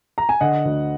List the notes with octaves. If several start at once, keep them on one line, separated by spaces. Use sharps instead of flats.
A#5
G#5
D3 D#5 F#5
D2